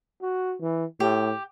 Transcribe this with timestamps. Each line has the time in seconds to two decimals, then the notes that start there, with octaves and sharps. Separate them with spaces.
0.22 F#4
0.61 E3
1.00 A2 G4